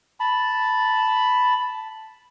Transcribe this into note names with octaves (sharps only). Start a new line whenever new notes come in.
A5 B5